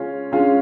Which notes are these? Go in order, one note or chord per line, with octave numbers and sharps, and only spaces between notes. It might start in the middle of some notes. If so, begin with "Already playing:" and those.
Already playing: C#3 G#3 C#4 F4
C#3 G#3 C#4 F4